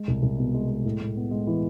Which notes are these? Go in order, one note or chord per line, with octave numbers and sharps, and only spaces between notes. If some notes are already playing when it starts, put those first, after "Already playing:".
Already playing: G#3
C2
C2
B2
G#3
G#3
A2
A2
B3
G#3
E3